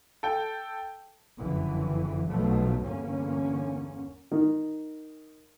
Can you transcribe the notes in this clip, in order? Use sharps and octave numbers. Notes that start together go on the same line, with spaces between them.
A4 G5
F#1 F2 D3 E3
B1 B2 F3 F#3 A3
G1 E2 D3 A#3 C#4
D#3